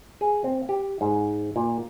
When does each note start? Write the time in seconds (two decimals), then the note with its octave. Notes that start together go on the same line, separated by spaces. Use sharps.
0.21 G#4
0.44 C4
0.69 G4
1.01 G#2
1.56 A#2